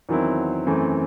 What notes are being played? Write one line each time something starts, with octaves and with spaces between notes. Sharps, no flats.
E2 D#3 F#3 C4 E4
F#2 E3 A3 C4